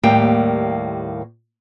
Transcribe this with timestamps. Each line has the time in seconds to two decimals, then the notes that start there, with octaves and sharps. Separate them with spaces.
0.03 D#2 A2 G3 A#3 G5